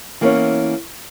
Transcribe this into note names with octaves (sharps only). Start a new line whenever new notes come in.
E3 A#3 B3 C#4 A#4 C#5